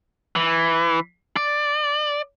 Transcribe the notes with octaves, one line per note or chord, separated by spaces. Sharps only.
E3
D5